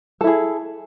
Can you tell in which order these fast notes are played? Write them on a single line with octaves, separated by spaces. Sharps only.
A4 E4 G#4